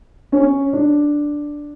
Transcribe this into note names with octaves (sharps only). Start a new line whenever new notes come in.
C#4
D4